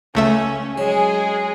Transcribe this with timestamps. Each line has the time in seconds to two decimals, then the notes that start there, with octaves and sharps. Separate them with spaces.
0.15 C#2 A3 C#4 E5
0.78 F#3 G#3 G#4